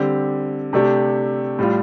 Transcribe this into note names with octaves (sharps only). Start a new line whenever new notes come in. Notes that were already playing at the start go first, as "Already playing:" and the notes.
Already playing: D3 G3 C4 G4
C3 A3 D4 G4
A2 G3 F4